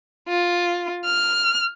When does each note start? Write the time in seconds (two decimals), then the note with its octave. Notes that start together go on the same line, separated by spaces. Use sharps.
0.28 F4
1.04 F6